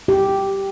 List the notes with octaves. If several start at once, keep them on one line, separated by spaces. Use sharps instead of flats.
G4